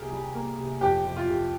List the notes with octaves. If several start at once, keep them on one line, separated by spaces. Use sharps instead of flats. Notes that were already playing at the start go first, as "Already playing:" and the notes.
Already playing: C2 C3 A#3 G4 G#4 A#4
G3
A#3
C3
F2 G4
C3
F4
C3